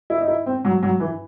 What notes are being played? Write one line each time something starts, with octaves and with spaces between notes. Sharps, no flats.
E4
D#4
E4
C4
F#3
F#3
E3